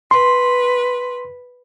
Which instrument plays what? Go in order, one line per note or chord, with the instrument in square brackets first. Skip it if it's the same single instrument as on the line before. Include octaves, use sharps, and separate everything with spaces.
[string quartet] B4 [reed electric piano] C6